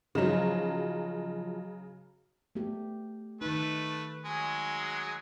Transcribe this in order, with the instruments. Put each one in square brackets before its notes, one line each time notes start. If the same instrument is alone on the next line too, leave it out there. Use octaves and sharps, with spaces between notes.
[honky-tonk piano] C#3 F#3 [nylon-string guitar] F3 D#4
[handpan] A3 B3 G4
[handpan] D#3 D#4 [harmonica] A3 B4
[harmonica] F#3 G#3 G#4